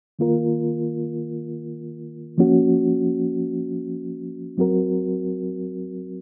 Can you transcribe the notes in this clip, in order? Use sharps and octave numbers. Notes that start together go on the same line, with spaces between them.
D#3 A#3 F4 A#4
F3 A#3 C#4 F#4
F#3 C4 F#4 A#4